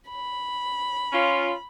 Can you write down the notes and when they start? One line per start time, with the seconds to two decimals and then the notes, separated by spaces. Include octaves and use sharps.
0.11 B5
1.13 C#4 F4